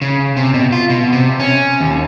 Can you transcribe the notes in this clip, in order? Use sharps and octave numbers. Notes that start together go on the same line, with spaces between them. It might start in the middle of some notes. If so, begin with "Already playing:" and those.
C#3
C3
B2
F4
B2
C3
C#4
D#2